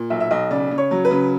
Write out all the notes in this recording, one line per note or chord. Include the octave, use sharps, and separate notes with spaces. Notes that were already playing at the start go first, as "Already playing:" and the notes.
Already playing: A#2
B1 E5
E5
B1 D#5
C#3 D5
C#3
C#5
F#3
B4
C#3